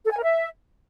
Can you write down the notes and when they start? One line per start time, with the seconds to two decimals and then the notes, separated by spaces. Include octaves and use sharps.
0.04 A4
0.10 G#5
0.17 A#4
0.23 E5